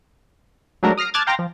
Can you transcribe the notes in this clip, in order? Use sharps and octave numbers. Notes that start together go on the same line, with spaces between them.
F#3 G#3 A3 D4 F#4 A#4
D#6 F6 A#6 C7 D7
A5 D6 F6 F#6 G#6 A6
F5 G5 A#5 C6 D6 A#6
F3